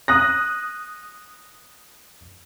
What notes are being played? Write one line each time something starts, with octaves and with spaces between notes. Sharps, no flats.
D#6 F#6 A#6